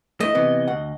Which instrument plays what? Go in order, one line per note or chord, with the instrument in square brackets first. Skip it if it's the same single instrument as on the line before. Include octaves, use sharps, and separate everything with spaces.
[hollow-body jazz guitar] A3 E4 [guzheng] D#5
[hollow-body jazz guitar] C3 E3 B3
D2 F#5